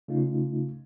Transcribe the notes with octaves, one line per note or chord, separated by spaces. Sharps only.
C#3 A3 D#4 F4